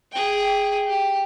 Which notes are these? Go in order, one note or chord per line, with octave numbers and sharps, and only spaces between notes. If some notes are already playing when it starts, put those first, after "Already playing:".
G#4 G5
G4